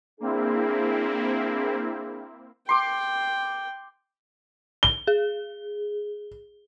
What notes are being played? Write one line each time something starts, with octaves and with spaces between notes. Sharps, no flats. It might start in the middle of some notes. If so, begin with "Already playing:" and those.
A#3 C4 D4 E4 G#4
G5 C6 D6
G7
G#4